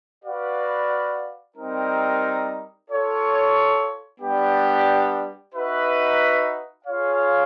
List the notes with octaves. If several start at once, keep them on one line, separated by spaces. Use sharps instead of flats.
F#4 B4 D5 F5
G3 C4 D#4 G4 A#4
F4 A4 C#5
G3 B3 D4 G4
D#4 F#4 B4 E5
F4 G#4 C#5 F5